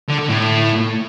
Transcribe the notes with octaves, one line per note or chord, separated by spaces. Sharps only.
D3
D3
A2